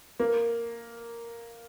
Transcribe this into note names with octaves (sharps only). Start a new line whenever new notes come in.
A#3